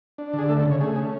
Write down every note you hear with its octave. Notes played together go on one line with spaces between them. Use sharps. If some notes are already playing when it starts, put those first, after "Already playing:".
D4
D3
G#4
A3 A4
A4
C#3
C#5
A3 G#4
C#4